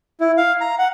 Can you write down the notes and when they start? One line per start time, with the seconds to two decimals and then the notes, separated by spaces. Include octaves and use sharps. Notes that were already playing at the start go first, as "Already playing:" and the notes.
0.20 E4
0.37 F5
0.61 A#5
0.79 F#5